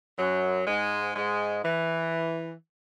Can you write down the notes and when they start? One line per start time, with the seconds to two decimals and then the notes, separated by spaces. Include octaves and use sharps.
0.18 F#2 F#3
0.67 G#2 G#3
1.16 G#2 G#3
1.64 E3